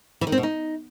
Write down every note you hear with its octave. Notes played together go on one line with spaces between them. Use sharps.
E3
D#3
C4
B2
D#4